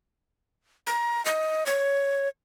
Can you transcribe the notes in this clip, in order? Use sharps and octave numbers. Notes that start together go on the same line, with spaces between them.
A#5
D#5
C#5